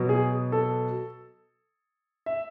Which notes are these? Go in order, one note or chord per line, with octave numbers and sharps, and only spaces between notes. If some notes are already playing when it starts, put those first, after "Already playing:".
Already playing: B2 F#3
G#4
A4
E5